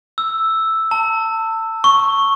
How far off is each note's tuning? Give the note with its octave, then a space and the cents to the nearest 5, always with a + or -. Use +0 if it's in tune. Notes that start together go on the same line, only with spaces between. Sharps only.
E6 +0
A5 +30
C#6 -5